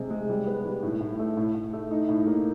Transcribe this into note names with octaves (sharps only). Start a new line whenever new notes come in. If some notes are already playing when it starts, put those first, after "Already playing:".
Already playing: C3 G#3
G#3
G3
B3
G3
A2
A2
A3
A2
A2
A3
D#4
A2
A#3